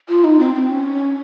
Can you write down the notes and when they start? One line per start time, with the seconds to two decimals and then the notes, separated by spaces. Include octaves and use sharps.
0.09 F4
0.24 D#4
0.39 C4
0.55 C4
0.70 C#4